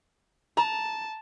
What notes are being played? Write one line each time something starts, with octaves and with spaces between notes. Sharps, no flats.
A5 A#5